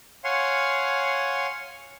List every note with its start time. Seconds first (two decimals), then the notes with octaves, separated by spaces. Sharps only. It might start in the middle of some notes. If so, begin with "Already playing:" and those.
0.24 C#5 F5 F#5 G#5 C6